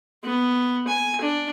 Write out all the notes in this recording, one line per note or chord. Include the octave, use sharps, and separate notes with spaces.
B3
G#5
D4